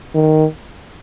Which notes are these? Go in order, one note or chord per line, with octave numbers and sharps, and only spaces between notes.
D#3